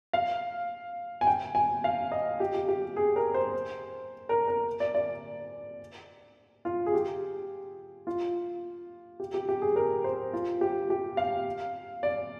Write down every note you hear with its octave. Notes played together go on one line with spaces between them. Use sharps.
F5
G#5
G5
G#5
F5
D#5
G4
G4
G4
G#4
A#4
C5
A#4
A#4
D5
D5
F4
G#4
G4
F4
G4
G4
G4
G#4
A#4
C5
F4
G4
G4
F5
D5